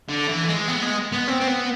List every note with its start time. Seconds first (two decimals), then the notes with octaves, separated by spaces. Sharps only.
0.09 D3
0.28 E3
0.48 G#3
0.68 B3
0.83 G#3
1.12 B3
1.28 C4
1.40 C4
1.48 B3